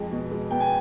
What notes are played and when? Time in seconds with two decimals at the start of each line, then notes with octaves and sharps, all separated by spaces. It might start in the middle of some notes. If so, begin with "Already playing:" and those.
Already playing: F2 G#3
0.12 B2
0.31 G#3
0.51 B3 G5
0.60 G#5